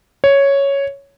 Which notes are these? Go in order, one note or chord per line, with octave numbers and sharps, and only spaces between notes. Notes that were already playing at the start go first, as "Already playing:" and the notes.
C#5